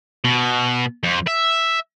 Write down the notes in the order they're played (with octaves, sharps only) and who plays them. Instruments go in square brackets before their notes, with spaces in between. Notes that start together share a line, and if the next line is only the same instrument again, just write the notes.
[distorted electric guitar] B2
F2
E5